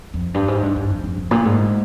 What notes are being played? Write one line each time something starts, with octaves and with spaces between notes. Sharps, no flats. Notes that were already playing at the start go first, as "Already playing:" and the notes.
F2
G2
G#2
G2
G2
F2
F2
F2
A#2
G#2